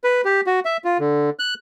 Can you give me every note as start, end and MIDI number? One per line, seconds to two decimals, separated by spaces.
0.04 0.21 71
0.25 0.41 67
0.46 0.60 66
0.65 0.77 76
0.84 0.98 65
0.99 1.30 50
1.39 1.54 90